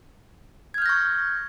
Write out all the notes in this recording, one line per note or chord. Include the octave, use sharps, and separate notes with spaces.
C#6 F6 G6 G#6 A#6